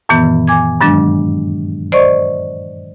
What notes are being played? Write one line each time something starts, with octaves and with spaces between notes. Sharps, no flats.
F#2 A#2 D#3 E3 B3
G#5 D6 G#6
G2 D#3 F#3 G#3 D4
C5 D5 D#5 C#6